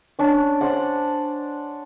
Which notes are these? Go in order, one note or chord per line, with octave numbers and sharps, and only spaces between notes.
C#4 D4
C5 D5 F#5